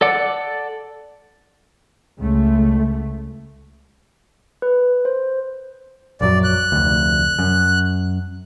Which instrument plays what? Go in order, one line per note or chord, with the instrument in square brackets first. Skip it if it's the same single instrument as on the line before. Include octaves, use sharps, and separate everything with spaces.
[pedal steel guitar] A4 D5 F#5 D6
[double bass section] C#2 A3
[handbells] B4
C5
[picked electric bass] A#1 F#2 F#3 [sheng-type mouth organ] D5
[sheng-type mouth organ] F#6
[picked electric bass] F1 D2
F#2